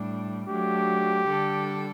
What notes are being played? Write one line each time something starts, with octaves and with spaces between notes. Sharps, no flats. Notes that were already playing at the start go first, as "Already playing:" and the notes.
Already playing: A2 G3 D4
F#3 A3 D4 G4
D3 G3 D4 A4